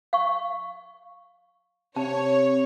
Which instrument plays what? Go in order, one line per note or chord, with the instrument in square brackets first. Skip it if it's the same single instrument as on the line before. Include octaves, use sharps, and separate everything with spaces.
[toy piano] F5 C#6
[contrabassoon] C3 [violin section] C#5 [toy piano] A5